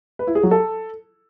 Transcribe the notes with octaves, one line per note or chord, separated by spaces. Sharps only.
B4
E4
G#4
F#3
A4